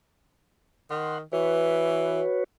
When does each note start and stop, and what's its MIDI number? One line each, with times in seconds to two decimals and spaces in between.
0.90 1.22 51
0.90 1.18 78
0.90 1.18 84
1.33 2.21 52
1.33 2.44 66
1.33 2.44 71
1.33 2.44 73